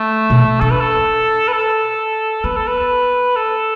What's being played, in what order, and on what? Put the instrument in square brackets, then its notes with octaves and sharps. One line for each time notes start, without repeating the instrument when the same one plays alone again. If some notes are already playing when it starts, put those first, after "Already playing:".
Already playing: [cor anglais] A3
[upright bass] B2
[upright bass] D4 [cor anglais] A4
[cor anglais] B4
A4
B4
A4
[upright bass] B3 [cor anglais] B4
[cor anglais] A4
B4
A4